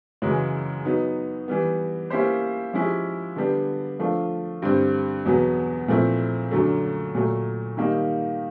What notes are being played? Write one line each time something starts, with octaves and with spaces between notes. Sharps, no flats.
F#2 C#3 E3 G#3
F#3 B3 D#4
E3 G3 B3
A#3 C#4 E4 G4 C5
F3 G#3 C#4 E4 G4
D3 G3 B3 D4 G4
F3 A3 D4 F4
G2 D3 G3 C4
E2 B2 F#3 B3
A#2 F3 A3 C4 E4
F#2 D3 F#3 A3
A#2 F#3 A3
D#3 G3 A#3 D#4